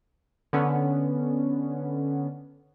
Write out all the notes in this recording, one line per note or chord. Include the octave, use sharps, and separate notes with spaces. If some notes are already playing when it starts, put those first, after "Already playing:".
D3 B3 C#4